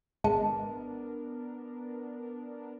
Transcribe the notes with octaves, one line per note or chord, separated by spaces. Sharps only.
G#1 G#3 B3 D4 A#4 A5 C#7